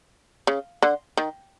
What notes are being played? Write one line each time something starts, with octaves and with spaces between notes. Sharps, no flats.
C#3
D3
D#3